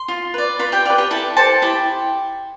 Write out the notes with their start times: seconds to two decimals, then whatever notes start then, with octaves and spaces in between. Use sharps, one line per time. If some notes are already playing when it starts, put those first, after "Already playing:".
Already playing: C6
0.08 F4
0.34 B4 D5
0.59 F4 B4 B5
0.72 G4 G5
0.85 D5 F5
0.90 B4
0.98 G4 G5
1.11 E4 A4 A5
1.37 G4 A4 C5 A5
1.62 E4 G4 G5